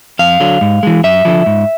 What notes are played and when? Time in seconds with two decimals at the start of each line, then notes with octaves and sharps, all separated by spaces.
0.19 F2 F5
0.40 D3 F#3
0.61 G#2
0.83 E3 G#3
1.04 F#2 E5
1.25 D3 F3
1.46 G#2